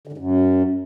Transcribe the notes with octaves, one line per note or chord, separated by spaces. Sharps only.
D3
G#2
F#2